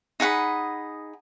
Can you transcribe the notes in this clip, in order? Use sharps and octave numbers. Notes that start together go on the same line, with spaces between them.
D#4 G#4 F#5 B5